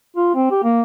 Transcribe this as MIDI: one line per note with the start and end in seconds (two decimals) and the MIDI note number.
0.16 0.34 65
0.35 0.49 60
0.51 0.62 67
0.64 0.83 58